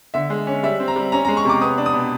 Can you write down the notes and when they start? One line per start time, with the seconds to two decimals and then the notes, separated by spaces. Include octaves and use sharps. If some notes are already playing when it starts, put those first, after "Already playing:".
0.14 D3 E5
0.30 G#3
0.47 C#4
0.63 G3 E5
0.80 C4
0.88 A#5
0.96 G3
1.12 C#4 A#5
1.25 A#5
1.28 G#3
1.37 C#6
1.45 C3 D6
1.61 B3 D#6
1.78 D4
1.86 D#6
1.93 B2